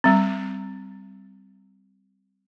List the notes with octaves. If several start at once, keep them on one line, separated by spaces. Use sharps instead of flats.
G3 C4